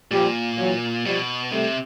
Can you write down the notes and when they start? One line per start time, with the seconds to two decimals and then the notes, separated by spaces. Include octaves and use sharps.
0.11 A#2 F3 G3
0.58 E3 F#3
1.04 B2 F3 G3
1.51 C3 G3 A3